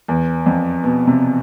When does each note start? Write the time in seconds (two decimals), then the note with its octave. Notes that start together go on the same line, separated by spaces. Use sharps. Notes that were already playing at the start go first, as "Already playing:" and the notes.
0.08 E2
0.46 F2
0.84 B2
1.07 C3